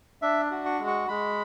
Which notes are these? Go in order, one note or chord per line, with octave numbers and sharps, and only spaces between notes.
D4 E5
F#4
C#6
G#3
C#6
G#3 B5